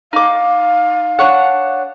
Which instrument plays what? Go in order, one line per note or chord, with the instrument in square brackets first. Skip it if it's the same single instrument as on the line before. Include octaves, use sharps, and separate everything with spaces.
[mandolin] D#4 D6 [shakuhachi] F5
[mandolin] D4 C#5 F#5